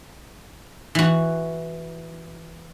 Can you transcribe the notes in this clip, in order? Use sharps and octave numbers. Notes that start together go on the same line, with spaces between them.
E3 F#4